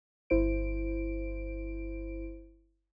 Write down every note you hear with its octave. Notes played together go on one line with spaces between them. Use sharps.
G1 E4 C5 D7